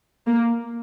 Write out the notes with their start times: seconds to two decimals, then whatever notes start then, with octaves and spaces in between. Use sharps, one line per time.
0.27 A#3